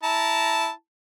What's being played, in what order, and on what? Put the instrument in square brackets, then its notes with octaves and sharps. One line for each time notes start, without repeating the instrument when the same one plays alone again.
[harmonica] E4 A5 A#5